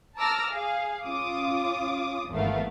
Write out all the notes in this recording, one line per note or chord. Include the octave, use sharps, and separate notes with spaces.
A5 A#5 D6 E6 F6 A#6
G#4 F5
C#4 F4 D6 D#6
G#1 E2 A3 B3 A#4 F5